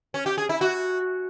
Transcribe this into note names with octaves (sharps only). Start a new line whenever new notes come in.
C#4
G4
G#4
E4
F#4